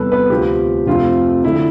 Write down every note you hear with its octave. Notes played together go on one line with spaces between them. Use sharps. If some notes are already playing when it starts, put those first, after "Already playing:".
Already playing: E2 C3 G3 B3 A4 B4
B4
D2 C3 F3 C4 G4
F2 C3 F3 A3 C4 F4
D3 F3 A3 E4